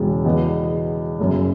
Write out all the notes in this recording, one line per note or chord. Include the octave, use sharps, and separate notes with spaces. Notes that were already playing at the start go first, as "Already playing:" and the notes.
Already playing: E1 E2 C#3
E2 B2 B3
F#1 F#2 C#3